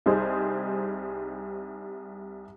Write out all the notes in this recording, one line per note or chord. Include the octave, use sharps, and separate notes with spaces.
C2 G3 D#4 G#4 C5